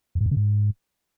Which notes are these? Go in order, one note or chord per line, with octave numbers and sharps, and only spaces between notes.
F2
G#2
F2
C#3
G#2